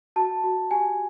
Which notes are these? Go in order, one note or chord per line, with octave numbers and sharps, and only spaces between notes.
F#4 A5
F#4
G4 G#5